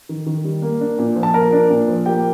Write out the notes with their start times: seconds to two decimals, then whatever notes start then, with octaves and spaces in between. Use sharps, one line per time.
0.09 D#3
0.26 D#3
0.44 G3
0.62 A#3
0.81 D4
0.99 A#2
1.16 F3
1.23 A5
1.34 A#3 A#4 A#5
1.52 D4
1.70 A#2
1.88 F3
2.06 A#3 G4 G5